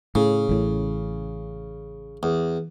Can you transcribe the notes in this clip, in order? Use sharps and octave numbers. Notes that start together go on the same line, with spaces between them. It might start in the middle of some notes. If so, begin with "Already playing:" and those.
A2 C#3
A1 A2
E2